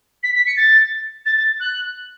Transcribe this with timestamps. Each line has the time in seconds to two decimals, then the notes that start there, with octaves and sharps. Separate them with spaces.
0.23 B6
0.34 B6
0.46 C#7
0.56 A6
1.25 A6
1.37 A6
1.59 F#6